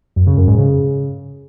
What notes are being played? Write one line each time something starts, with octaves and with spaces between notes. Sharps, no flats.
F#2
C#3
F#2
G#2
C#3